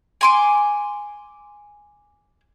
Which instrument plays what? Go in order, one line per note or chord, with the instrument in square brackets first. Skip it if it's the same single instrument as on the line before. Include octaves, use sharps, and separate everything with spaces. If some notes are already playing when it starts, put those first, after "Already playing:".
[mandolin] G#5 C6 D6